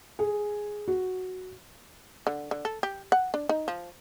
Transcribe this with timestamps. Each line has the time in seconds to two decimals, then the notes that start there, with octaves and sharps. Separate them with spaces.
0.19 G#4
0.88 F#4
2.27 D3
2.51 D3
2.65 A4
2.83 G4
3.12 F#5
3.34 D4
3.49 D#4
3.68 F3